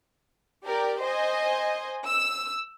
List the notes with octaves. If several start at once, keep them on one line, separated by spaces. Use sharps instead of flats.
G4 A#4 D5
C5 D#5 G#5
E6